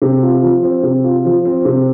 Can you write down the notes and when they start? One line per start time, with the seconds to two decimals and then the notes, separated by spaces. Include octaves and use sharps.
0.02 C3
0.22 F4
0.43 F3
0.63 C4
0.83 C3
1.04 F4
1.25 F3
1.45 C4
1.65 C3